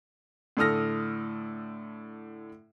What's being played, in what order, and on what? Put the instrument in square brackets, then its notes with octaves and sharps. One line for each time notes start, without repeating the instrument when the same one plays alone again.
[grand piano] A2 D3 A4 D#6 F6 A#6